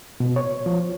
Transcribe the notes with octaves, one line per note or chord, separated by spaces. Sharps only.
B2
C#5
F3